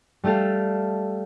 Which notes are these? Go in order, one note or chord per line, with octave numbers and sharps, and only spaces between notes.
G3 A3 G4 A4 F5